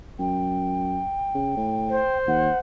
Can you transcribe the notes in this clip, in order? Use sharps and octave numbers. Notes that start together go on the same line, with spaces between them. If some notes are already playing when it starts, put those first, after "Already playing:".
F#2 G5
C#3
A2
C5
D#2 F#5